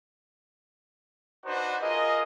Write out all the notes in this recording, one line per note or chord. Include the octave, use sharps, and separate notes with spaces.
D4 D#4 F#4 B4 C5
F4 G#4 A#4 D#5